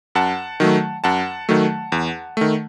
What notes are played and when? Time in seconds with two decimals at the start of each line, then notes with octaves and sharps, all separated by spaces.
0.15 F#2 F#5 A5
0.60 D#3 F#3 A3
1.04 F#2 F#5 A5
1.49 D#3 F#3 A3
1.92 E2
2.37 D#3 A3